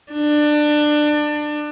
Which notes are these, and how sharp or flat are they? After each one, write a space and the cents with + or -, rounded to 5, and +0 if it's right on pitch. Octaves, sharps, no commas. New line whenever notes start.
D4 +20